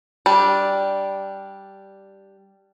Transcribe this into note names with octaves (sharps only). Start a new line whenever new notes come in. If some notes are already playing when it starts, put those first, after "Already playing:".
G3 D4